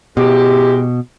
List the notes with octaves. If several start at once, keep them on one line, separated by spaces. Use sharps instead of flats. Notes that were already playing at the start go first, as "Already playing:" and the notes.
B2 G#3 E4 G4